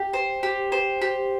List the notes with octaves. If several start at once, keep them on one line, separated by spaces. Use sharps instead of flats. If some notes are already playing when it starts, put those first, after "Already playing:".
Already playing: G4
C5
G4
C5
G4